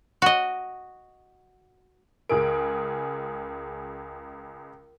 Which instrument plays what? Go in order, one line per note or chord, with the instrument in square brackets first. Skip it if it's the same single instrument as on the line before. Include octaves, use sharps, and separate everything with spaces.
[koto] F#4 D#5
[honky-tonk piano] C#2 G#4 D7 [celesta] A#4